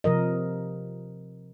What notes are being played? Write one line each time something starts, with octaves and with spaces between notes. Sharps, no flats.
C3 F3 A#4 D#5